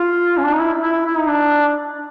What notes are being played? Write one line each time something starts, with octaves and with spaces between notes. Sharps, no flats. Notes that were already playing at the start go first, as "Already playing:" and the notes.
Already playing: F4
C#4
D4
D#4
E4
E4
E4
D#4
D4